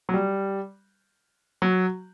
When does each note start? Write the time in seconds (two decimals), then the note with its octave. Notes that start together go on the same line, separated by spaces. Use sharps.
0.09 F#3
0.14 G3
1.62 F#3